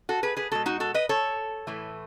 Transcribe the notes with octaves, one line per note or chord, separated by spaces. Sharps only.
F#4 A4
G#4 B4
G#4 B4
B2 G#3 F#4 A4
D#4 F#4
F#4 A4
B4 D#5
A4 C#5
A2 E3 A3